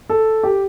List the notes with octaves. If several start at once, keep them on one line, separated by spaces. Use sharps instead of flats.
A4
G4